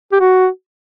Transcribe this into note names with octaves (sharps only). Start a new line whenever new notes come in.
G4
F#4